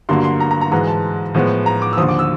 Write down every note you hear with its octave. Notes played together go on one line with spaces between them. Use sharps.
G2 D3 F#3 A#3 C6
C6
A#5
A#5
A#5
G#2 E3 G#3 A#5
A5
A2 F3 G#3 B3
A#5
D6
E6
D#2 D3 F3 D#6
D6
E6